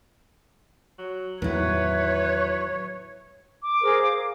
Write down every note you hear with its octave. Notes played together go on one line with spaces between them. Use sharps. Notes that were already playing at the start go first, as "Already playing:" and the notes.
F#3
E2 A2 D#3 F#3 E4 B4 C#5
D6
G#4 A#4 C5
F5